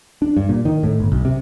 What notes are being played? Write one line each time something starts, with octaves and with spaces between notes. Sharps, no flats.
D4
G2
A#2
D#3
A2
G1
B1
C3